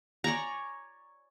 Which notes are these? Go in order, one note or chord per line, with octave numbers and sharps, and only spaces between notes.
C#5 D5 G#5 A#5